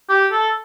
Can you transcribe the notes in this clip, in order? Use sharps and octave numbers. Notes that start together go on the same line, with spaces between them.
G4
A4